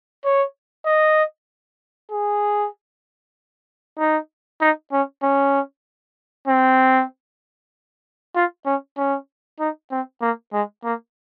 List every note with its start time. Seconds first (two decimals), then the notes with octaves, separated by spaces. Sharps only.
0.25 C#5
0.86 D#5
2.11 G#4
3.98 D#4
4.61 D#4
4.92 C#4
5.23 C#4
6.48 C4
8.35 F4
8.66 C#4
8.97 C#4
9.59 D#4
9.91 C4
10.21 A#3
10.53 G#3
10.84 A#3